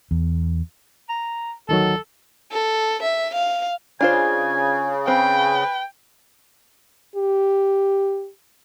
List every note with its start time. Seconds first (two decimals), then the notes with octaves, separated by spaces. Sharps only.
0.11 E2
1.09 A#5
1.69 D2 D#3 F#3 A4
2.52 A4
3.03 E5
3.35 F5
4.01 C#3 D4 F4 C5 G#5
5.08 C4 B4 G5
7.16 G4